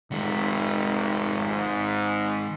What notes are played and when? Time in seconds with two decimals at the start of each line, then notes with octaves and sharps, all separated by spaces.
0.12 F1 D#3 G#3
1.49 G#2